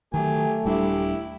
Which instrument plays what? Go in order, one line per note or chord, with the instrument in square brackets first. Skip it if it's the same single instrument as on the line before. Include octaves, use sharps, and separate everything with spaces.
[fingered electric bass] D#3 F#3 [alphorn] A3 [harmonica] G4 G#5
[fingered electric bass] D#1 G3 D4 [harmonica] E4 G4